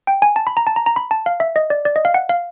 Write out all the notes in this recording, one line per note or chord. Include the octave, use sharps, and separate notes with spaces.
G5
G#5
A5
B5
A#5
A5
A#5
A#5
B5
A5
F5
E5
D#5
D5
D5
D#5
F5
F#5
F5